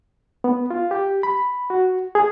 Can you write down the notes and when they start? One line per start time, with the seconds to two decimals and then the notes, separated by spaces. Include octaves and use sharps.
0.44 B3
0.71 F4
0.91 G4
1.23 B5
1.70 F#4
2.15 G#4